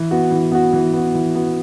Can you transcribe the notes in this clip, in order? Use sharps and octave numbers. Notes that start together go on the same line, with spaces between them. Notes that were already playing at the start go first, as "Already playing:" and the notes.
Already playing: E3
B3 F#4
E3
B3 F#4
E3
B3 F#4
E3
B3 F#4